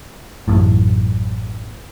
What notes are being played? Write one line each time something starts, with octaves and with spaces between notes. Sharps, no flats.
A1 F#2 A2